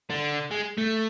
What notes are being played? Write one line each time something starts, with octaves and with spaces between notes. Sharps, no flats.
D3
G#3
A3